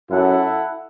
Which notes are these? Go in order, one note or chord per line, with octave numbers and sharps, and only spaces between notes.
F#2 E4 A4 F#5